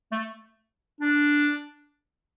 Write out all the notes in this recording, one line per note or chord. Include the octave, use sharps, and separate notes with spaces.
A3
D4